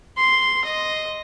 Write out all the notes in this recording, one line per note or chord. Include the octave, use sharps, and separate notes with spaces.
C6
D#5